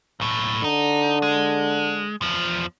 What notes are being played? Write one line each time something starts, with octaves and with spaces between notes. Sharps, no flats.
B1 A2
D3 D#4
G#3
E2 F3